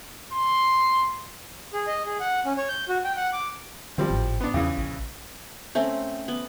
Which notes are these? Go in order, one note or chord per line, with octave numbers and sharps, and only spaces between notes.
C6
G#4
D#5
G#4
F#5
C#4
C#5
G6
F#4
G5
F#5
D6
D#3 F3 G3 C4
G#1 A2
B3 D4
E2 C#3 E3 D#6
A#1
A3 C4 C#4
B3